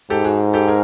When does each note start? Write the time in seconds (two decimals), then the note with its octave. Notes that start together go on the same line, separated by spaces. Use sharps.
0.10 G#2 G4 A4
0.24 F#4 G#4
0.53 G4 A4
0.68 G#4 A#4